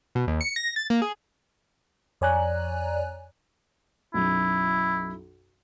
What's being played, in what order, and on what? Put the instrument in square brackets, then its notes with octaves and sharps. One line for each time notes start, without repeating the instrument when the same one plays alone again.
[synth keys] B2
D#2
C#7
A#6
A6
A#3
G#4
[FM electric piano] F2 C#5 D5 G#5 A#5 F#6
[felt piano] B1 F#2 [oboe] E4